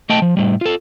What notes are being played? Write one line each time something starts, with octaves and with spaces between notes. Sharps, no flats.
A3 D#5 G5 A5
F3
A2 G3
F4 A4